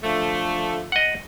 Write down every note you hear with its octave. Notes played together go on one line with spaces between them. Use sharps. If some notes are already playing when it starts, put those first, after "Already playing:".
D3 F3 A3
D#5 F#5